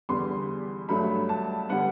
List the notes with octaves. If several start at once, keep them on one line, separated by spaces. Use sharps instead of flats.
E2 D3 G3 B3 C6
G2 F#3 A3 B5
A5
D3 G3 B3 F#5